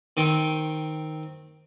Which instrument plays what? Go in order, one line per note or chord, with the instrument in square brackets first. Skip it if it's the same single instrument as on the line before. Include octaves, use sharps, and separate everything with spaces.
[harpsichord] D#3 C4